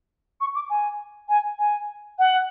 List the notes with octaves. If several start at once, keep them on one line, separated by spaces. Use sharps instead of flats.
C#6
D6
G#5
G#5
G#5
F#5